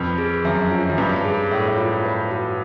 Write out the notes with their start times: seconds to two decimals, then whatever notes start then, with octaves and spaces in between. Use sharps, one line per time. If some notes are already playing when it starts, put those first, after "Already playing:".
Already playing: F2 B4
0.18 G#4
0.45 F#2 E5
0.71 F4
0.89 F#2
0.98 G2 B4
1.25 G#4
1.51 A2 E5
1.78 F4
2.05 B4
2.31 F#4